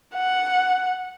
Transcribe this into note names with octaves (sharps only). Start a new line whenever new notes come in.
F#5